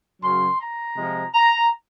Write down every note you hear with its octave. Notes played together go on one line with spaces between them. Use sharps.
F#2 C#3 F#3 C#4 C6
A#5
C3 F3 G#3
A#5